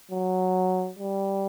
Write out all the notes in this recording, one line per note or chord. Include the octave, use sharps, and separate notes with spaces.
F#3
G3